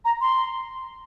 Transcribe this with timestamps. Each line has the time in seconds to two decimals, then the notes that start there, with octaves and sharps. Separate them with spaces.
0.05 A#5
0.21 C6